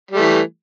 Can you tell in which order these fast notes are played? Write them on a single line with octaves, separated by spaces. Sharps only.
G3 A3 E3